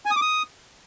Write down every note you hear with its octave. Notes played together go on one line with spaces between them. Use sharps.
G#5
D#6
D6
D#6